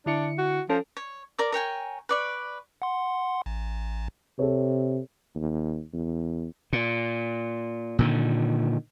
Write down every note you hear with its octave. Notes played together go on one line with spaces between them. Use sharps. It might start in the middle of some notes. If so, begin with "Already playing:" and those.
D3 D4 E4 C#7
F#4
F3 C#4 A4
C#5
A#4 D5 D6
A#4 C#5 G5 G#5
B4 D5 C#6
F#5 C6
A1
C3 A4 C#5
D#2
E2
A#2
A#2 D3 D#3